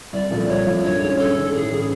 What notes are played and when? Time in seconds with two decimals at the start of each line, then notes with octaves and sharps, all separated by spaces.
0.13 C2 D5
0.31 A#2 F3 A3
0.48 C2 C#5
0.66 A#2 F3 A3
0.84 G2 C#5
1.02 D#3 G#3 C#4
1.19 G2 A4
1.37 D#3 G#3 C#4
1.53 A2 G#4
1.72 E3 G#3 C#4